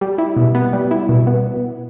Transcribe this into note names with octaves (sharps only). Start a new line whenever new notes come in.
G3
E4
B2
B3
G3
E4
B2
B3